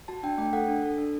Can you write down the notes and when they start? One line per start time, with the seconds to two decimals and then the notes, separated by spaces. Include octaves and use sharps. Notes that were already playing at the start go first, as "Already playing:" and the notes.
0.08 F#4 A5
0.23 D4 G5
0.38 A3 G5
0.53 A4 F#5
0.68 D4
0.83 A4
0.98 D4